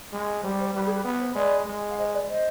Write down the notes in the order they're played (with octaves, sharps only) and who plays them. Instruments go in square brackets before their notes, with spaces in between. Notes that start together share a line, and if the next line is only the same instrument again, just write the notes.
[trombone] G#3
[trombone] G3 [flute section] C5
[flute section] C5
[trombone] G3 [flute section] B4
[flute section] G#4
B4
[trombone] B3
[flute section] C5
[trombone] G#3 [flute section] B4 D5
[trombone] G#3
[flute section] F5
C5 D#5
B4 D5
C5 D#5